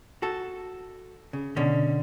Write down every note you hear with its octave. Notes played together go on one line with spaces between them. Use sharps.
F#4 A4
C#3
B2 D3 C#4